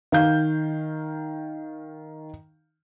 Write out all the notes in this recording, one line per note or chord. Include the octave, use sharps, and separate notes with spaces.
D#3 F5 G6